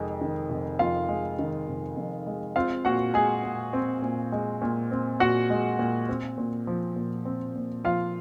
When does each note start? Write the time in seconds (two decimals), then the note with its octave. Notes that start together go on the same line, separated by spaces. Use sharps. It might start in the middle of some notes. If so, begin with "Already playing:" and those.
Already playing: F1 F2 D#3 G#3
0.21 D#3
0.50 F1
0.79 F2 F4 F5
1.09 G#3
1.39 D#3
1.68 F1
1.97 F2
2.27 G#3
2.56 C4 F4 F5
2.85 A#2 F#4 F#5
3.14 G#3 G#4 G#5
3.44 A#2
3.73 C4
4.02 A#2
4.32 G#3
4.62 A#2
4.91 C4
5.20 A#2 F#4 F#5
5.50 G#3
5.79 A#2
6.09 C4
6.38 A#2
6.67 F3
6.96 A#2
7.25 C4
7.56 A#2
7.84 F3 F4 F5